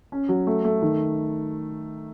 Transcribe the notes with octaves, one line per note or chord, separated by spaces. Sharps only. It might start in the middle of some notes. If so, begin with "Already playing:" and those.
C#4
F#3
A3
A3
D#3